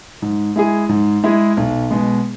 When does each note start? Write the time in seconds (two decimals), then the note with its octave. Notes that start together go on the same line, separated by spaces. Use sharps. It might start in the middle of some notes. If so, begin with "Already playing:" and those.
0.22 G#2
0.56 G#3 E4 G#4
0.89 G#2
1.24 G#3 E4 G#4
1.57 B1
1.91 B2 G#3